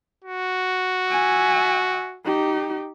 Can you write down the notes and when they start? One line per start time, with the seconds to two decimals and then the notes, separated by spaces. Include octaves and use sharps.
0.24 F#4
1.10 E5 G#5
2.25 D#4 G4